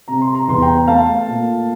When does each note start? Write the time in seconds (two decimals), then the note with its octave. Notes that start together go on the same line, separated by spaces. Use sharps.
0.08 C3 A#5
0.21 C6
0.35 A#5
0.48 E2 C6
0.62 G5 A#5
0.87 A3 F5 A5
1.27 A#2